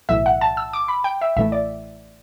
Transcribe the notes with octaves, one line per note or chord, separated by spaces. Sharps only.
B1 A2 E3 E5
F#5
A5
E6
D6
B5
G5
E5
A1 A2 E3 A3 E5
D5